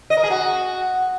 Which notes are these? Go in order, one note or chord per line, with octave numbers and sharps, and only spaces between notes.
D#5
A#4
G#4
F#4